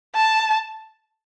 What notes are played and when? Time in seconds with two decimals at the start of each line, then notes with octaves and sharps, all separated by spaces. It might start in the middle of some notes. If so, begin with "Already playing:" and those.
0.15 A5